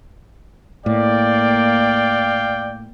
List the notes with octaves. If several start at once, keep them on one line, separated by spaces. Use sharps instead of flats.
A2 A#3 D5 F5 G5